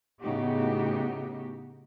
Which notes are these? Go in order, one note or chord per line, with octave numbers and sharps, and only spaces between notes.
A2 C#3 B3 D#4 F#4 G4